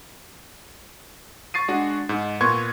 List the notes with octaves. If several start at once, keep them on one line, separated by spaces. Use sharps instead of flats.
C#6 A6 C7 D#7
G#3 D4 F#4
G#2
A#2 B3 C6 C#6 G#6